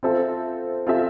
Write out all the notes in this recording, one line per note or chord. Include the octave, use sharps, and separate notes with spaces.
C4 F4 A4 C5 E5
C4 F4 A4 C5 E5